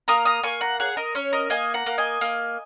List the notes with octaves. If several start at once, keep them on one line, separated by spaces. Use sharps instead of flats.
A#3 A#5 D#6
A#5 D#6
A#3 G#5 C#6
F#5 A#5
G#4 C#5 F#5
A#4 D#5
C#4 C#5
A#4 D#5
A#3 D#5 G#5
F#5 A#5
A#3
D#5 G#5
A#3